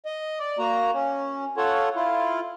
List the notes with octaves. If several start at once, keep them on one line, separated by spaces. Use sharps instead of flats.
D#5
D5
A#3 F#4 A#5
C#4
F4 A4 C#5 F#5
E4 F4